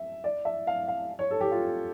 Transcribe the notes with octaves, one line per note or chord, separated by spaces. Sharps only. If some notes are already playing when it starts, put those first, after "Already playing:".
Already playing: E5
D5
E5
F5
F5
C#5
A4
G4
F4